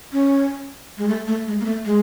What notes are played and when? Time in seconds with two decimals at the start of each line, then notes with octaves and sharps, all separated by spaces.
0.13 C#4
0.98 G#3
1.08 A3
1.27 A3
1.47 G#3
1.60 A#3
1.65 A3
1.85 G#3